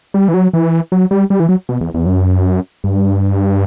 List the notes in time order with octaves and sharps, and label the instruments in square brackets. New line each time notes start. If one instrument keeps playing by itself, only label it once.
[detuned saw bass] G3
E3
F#3
E3
F#3
G3
G3
E3
F#3
B2
E2
E2
F#2
G2